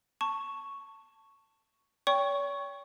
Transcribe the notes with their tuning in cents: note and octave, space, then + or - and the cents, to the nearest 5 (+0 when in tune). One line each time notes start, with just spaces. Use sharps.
A5 +15 C#6 +0
C#5 +40 G5 +10 C#6 +0